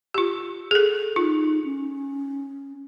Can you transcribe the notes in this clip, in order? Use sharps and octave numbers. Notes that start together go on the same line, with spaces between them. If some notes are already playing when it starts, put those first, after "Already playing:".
F4 G4
G#4 A4
D#4 F4
C#4